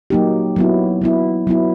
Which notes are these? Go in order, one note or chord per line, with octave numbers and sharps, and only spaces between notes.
F#3 A#3 D#4 G4
F#3 B3 E4
F#3 B3 E4
F#3 B3 E4